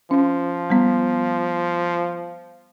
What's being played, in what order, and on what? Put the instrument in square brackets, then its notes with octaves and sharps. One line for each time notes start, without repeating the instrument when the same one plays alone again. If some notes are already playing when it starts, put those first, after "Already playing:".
[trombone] F3 [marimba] C#4
[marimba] G3 B3